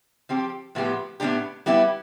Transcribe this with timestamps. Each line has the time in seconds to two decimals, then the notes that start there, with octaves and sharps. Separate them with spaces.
0.29 F3 C4 G4
0.75 A2 F3 B3 D4 G4
1.20 A2 F3 B3 D4 G4
1.66 G3 B3 E4 G4